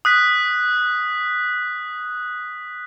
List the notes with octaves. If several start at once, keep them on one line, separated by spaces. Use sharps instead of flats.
D#6 F#6 B6